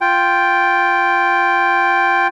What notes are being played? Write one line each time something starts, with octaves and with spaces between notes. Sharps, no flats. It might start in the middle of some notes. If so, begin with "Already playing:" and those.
F4 G5